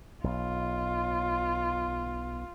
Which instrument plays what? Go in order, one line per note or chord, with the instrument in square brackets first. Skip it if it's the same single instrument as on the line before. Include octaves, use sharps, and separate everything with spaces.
[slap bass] B1 [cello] F4